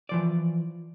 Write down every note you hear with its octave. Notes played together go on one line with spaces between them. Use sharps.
E3 F3 D5